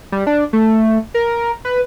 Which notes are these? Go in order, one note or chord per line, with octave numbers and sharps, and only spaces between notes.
G3
D4
A3
A#4
B4